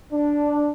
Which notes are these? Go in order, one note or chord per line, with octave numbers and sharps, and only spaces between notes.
D4